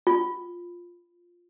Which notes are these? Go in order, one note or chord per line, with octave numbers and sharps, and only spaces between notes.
F4